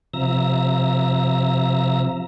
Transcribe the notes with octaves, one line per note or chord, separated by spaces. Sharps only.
C3 F3 E5 A#5 A#6